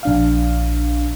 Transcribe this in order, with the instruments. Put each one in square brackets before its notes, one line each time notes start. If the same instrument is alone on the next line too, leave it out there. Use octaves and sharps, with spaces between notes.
[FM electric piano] A#1 D4 F5